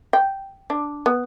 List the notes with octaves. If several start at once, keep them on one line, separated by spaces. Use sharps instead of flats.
G5
D4
B3